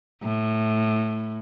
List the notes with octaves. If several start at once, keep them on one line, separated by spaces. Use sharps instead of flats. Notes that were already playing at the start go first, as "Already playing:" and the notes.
A2